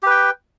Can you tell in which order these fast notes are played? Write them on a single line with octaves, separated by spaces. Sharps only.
G4 B4 G5